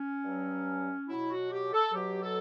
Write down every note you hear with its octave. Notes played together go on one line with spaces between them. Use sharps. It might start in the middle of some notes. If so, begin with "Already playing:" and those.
Already playing: C#4
G2 F#3
B2 F#3 E4
F#4
G4
A4
B2 F#3 G4
A4